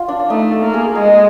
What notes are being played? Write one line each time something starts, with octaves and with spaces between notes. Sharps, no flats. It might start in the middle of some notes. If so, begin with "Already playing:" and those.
Already playing: F4
D4
D4
A3 D#4
A4
A#3
G#4
G#3 G#4